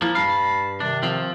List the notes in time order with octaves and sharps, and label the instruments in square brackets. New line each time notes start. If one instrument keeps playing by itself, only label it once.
[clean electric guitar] F3 A#3 [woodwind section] E4
[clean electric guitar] G2 F5 [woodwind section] A5 B5
[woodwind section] C3 D#3 [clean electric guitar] D4
[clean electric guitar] F3 C4